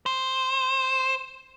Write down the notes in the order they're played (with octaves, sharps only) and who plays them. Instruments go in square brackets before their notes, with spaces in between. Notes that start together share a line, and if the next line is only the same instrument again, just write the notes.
[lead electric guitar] C5